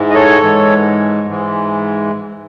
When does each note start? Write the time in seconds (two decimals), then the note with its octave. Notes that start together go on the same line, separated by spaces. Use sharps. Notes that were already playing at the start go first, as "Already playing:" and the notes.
Already playing: G#2 E3 G#3
0.10 D#5
0.15 A4 C#5
0.43 G#2 E3 G#3
1.28 G#2 E3 G#3